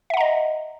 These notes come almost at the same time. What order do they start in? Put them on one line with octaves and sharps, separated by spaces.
E5 F#5 A#5 D#5